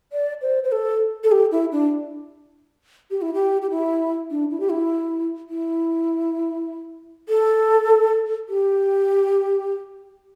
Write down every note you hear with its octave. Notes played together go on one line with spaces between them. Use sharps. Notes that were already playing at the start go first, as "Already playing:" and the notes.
D5
C5
C5
A4
A4
G4
E4
D4
G4
E4
G4
G4
E4
D4
E4
G4
E4
E4
A4
G4